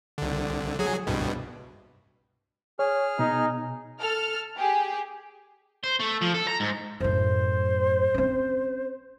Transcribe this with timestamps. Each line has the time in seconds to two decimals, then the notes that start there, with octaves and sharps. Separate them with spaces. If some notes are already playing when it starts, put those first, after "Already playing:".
0.18 C2 D3
0.79 F#3 G#4
1.07 C2 G2 B2
2.79 G#4 C#5 F6
3.19 B2 D#4
4.01 A4 F6
4.57 G4 G#4
5.84 C5
6.00 A3
6.21 F3
6.34 A4
6.48 A#5
6.60 G#2
7.00 F#2 A2 C5
8.14 C4 C#4